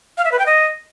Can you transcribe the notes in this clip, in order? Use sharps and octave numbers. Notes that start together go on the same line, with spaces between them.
F5
E5
B4
G5
D#5